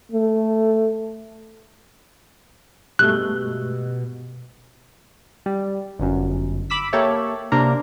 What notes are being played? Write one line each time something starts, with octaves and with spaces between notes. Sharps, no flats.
A3
G2 B2 G#3 A3 G4 E6 F#6 G7
G3
G1 F#2
B5 D6 E6 B6
A#3 G4 A4 C#5 E5
C3 A#3 D4 A#4